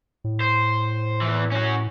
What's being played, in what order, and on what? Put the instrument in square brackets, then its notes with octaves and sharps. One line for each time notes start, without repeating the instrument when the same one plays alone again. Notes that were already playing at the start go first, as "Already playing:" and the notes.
[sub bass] A2
[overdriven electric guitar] C5
E2 E3
C#4 F#4